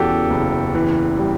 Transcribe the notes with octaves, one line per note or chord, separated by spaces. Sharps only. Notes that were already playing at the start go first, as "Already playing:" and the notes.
Already playing: E2 C#3 E3 F#4 G4 A4
F#1
E3
G3